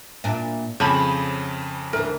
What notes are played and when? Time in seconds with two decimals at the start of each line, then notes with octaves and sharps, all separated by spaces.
0.24 A#2 D4 E4
0.80 F2 C#3 C#4 C5 A5 B5
1.93 D2 E3 A#4